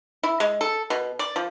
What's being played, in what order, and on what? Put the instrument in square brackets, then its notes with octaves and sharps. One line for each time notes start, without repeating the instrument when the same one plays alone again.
[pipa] E4
G#3
A4
B2
D5
F3